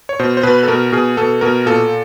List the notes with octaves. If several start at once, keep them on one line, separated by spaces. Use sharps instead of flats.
C#5
B2 C5
C5
B2 B4
A4
B2 A#4
B2 G#4
B2 A4
B2 A#4
A#2 A4